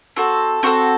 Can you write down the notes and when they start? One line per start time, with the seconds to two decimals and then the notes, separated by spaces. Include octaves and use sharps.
0.17 C4 F#4 A4
0.63 C4 F#4 A4